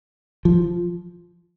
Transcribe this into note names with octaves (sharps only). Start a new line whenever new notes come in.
F3